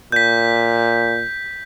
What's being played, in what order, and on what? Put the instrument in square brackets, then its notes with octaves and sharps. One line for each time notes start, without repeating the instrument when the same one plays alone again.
[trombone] A#2 [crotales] G6 B6